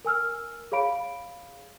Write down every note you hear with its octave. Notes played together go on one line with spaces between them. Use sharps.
A#4 G#5 E6 F6
G#4 C#5 F5 B5 D7